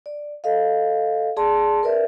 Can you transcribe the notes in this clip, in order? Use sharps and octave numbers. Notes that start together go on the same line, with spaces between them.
D5
A4 D#5 F5
G#4 D5 A5 C6
A#4 B4 D5 E5